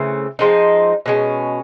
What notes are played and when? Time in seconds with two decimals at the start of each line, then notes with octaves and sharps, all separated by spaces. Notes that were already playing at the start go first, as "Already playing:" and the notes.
Already playing: C#3 E3 A3 C4
0.39 F3 G#3 C4 D#4
1.06 B2 G#3 C#4